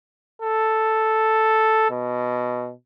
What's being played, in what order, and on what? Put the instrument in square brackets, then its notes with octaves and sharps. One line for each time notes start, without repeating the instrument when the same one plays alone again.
[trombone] A4
B2